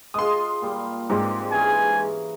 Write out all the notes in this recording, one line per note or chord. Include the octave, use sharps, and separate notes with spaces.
G#3 F4 C6 D#6
A#2 G3
G#2 G#3 C4 A#4 D5
E3 C#4 G#4 G#5